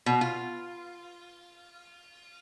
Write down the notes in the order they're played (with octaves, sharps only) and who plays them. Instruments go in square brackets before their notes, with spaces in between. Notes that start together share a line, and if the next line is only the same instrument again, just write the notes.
[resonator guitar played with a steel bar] B2
F4